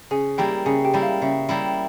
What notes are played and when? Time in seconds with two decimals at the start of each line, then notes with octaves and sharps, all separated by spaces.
0.11 C#3 G#4 G#5
0.38 G3 A#3 E4 G4 G5
0.66 C#3 G#4 G#5
0.84 G4 G5
0.93 G3 A#3 E4
1.02 F5
1.22 C#3 E5
1.49 G3 A#3 E4